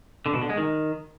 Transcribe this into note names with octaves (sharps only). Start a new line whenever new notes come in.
D3
B2
D3
G#3
D#3